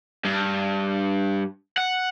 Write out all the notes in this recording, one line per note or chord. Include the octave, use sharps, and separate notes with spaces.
G2
F#5